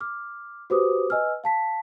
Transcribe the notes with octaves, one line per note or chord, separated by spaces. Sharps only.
D6 F6
F#4 G4 B4 C5 D6 D#6
B4 D#5 G#5 E6 F6
F5 A5 B6